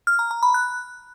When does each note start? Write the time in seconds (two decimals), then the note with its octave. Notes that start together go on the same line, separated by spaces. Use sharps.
0.07 F6
0.19 A#5
0.31 A#5
0.43 B5
0.54 F#6